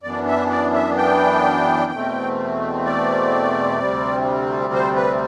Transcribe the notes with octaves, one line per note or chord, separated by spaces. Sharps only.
F#2 E3 B3 D4 D5
E5
D5
E5
G5
E2 B2 A3 C4
D5
D2 C3 G3 C4
C5
B4